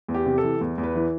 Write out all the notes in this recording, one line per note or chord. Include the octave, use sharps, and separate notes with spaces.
E2
G4
C3
A4
E3
E2
E2
B4
E3